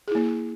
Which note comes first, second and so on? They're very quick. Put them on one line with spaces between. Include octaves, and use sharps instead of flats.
G#4 E4 A#3